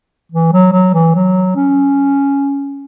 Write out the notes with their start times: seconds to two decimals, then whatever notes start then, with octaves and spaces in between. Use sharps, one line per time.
0.32 E3
0.53 F#3
0.73 F#3
0.94 E3
1.15 F#3
1.56 C#4